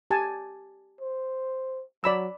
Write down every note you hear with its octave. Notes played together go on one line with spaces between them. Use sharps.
G4 G#5 A5
C5
F#3 D5 B5 E6